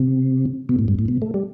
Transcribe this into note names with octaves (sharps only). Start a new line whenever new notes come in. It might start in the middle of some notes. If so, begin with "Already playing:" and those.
Already playing: C3
B2
A2
G2
A2
B2
A3
G3